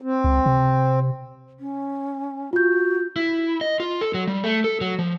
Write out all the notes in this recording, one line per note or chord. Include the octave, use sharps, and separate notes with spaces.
C4
C#2
C3
C#4
F4 F#4 G6
E4
D#5
F4
A4
F#3
G3
A3
A4
F#3
F3